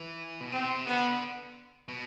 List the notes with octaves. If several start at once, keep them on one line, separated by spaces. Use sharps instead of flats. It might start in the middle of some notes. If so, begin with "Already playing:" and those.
Already playing: E3
B2
C3 C4
D3 B3
B2